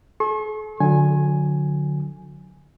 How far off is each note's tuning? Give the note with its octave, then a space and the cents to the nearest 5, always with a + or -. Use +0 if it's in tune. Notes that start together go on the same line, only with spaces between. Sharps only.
A4 -45 C#6 -45
D3 +0 F#3 -30 G#5 +0